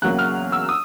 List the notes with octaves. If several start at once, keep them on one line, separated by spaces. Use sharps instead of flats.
E2 C#3 F#3 A#3 F#6
F6
E6
D#6